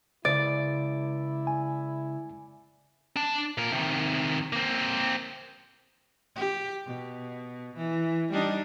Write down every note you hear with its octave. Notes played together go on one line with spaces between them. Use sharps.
C#3 G#3 E4 D5
G#5
D4 A5
A#2 A#4
C3 D#3
A#3 C4
G4
B2
E3
G3 D4 D#4